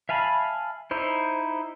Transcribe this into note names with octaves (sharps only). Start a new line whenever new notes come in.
E5 F5 G#5 A5 B5
D#4 E4 C5